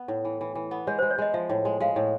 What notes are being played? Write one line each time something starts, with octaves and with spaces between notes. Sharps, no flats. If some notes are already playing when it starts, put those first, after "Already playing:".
Already playing: B3
A2
E3
E3
E3
B3
G#3 C#5
G#3 C5
C#5
G#3 D#5
F3 E5
A2
G#3
G#3 F5
A2